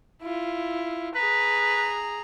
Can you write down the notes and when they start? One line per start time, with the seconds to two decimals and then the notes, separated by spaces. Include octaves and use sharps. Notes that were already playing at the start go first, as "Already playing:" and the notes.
0.22 E4 F4
1.15 G#4 B4 A#5